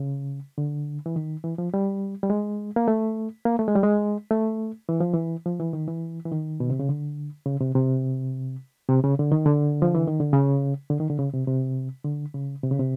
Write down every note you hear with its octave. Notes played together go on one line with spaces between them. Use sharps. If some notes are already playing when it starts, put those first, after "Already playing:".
Already playing: C#3
D3
E3
D#3
E3
F3
G3
G3
G#3
A#3
A3
A#3
A3
G#3
G3
G#3
A3
E3
F3
E3
F3
E3
D#3
E3
E3
D#3
B2
C3
C#3
D3
C#3
C3
C3
C3
C#3
D3
D#3
D3
F3
E3
D#3
D3
C#3
D3
D#3
D3
C#3
C3
C3
D3
C#3
C3
C#3
C3